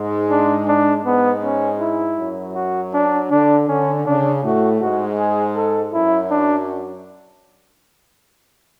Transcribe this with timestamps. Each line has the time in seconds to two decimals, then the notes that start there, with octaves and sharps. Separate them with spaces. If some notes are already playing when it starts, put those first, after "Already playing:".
Already playing: G#2 G#3
0.30 D4
0.68 D4
1.05 G#2 G#3 B3
1.44 C#4
1.80 E4
2.18 F#2 F#3
2.55 F#4
2.93 D4
3.31 D3 D4
3.68 D3 C#4
4.06 C#3 D4
4.43 A2 A3 F#4
4.80 G#2 G#3 F#4
5.18 G#4
5.55 A4
5.93 F#2 F#3 E4
6.30 D4